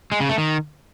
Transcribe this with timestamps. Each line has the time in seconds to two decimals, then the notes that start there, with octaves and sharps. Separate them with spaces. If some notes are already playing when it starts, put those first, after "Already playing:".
0.12 G#3
0.20 C#3
0.29 A3
0.38 D#3